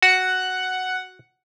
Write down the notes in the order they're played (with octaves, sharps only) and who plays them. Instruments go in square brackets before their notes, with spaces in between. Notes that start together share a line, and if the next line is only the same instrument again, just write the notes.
[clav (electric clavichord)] F#4 [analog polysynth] F#5